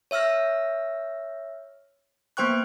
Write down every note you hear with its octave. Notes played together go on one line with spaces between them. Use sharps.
C#5 E5 E6 F6 A#6
A#3 B3 C5 G5 C#6 F#6